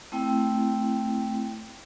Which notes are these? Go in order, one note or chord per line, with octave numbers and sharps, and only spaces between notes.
A3 C4 E4 G5